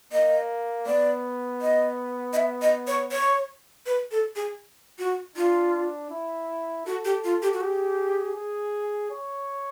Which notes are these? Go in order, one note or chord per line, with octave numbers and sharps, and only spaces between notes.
A#3 D#5
B3 D5
D#5
D#5
E5
D#5
C#5
C#5
B4
A4
G#4
F#4
D4 F4
E4
F#4 A4
G4
F4
G4
F#4
G4 G#4
G#4
C#5